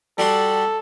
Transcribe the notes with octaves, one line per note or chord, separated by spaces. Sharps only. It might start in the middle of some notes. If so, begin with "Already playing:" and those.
G3 F#4 A4 C6